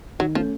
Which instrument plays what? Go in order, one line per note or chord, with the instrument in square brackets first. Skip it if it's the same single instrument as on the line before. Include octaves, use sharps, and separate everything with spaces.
[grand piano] D#3 [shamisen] F#3
[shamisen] F3 [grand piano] A3 C#4